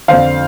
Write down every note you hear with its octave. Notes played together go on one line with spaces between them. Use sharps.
F2 D3 C5 F5